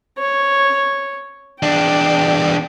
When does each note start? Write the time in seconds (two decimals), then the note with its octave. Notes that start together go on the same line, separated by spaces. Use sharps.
0.19 C#5
1.62 E2 D4 G5